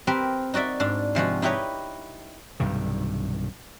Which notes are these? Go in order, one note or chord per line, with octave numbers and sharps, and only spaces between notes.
C4 G4 A#4 B4
D#4 F#4 D5 E5
G#2 D4
C3 F3 G#3 F#4
D#4 E4 G4 B4 C#5 D#5
B1 G2 C3 D#3